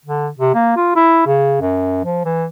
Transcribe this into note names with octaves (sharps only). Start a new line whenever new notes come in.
D3
C3
A#3
F4
E4
C#3
F#2
F3
E3